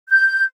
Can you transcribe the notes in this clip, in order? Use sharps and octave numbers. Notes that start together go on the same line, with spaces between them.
G6